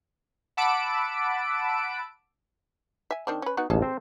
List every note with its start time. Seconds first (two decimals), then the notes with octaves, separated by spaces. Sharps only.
0.57 F#5 A5 B5 D6 E6 D7
3.11 E5 G#5
3.27 D#3 C4 D4
3.42 C#4 B4
3.57 B3 D#4 F#4
3.70 A1 D#2 G#4 A4 A5
3.82 C4 C5